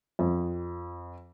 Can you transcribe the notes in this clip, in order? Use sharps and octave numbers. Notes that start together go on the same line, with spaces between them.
F2